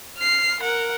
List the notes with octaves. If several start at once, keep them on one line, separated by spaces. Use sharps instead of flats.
F6 C7
A#4 F#5